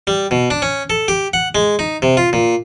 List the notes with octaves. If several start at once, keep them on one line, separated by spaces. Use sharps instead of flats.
G3
B2
D4
C#4
A4
G4
F#5
G#3
D#4
C3
F4
A#2